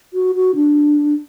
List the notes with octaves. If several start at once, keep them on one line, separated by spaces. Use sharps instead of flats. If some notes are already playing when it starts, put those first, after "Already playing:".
F#4
F#4
D4